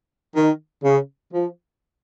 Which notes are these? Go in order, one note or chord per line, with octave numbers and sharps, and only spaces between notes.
D#3
C#3
F3